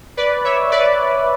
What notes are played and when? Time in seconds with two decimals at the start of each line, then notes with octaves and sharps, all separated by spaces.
0.17 B4 D5
0.45 C#5 E5
0.72 B4 D5